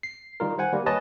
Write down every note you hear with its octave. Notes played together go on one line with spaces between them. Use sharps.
C7
D#3 G3 F4 A#4
C5 F#5 G#5
D#3 G3 A#3
B4 C#5 D#5 G#5 A5